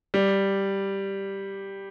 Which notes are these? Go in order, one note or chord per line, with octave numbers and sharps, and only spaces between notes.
G3